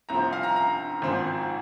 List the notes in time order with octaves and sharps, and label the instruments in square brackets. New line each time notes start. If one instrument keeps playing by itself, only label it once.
[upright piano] C2 C3 F3 C4 A#5
F5
A#5
A#5
G#1 G#2 F3 C4